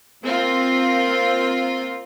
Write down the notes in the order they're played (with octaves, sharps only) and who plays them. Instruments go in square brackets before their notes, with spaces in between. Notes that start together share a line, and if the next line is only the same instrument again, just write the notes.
[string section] A#3 C4 F4 A#4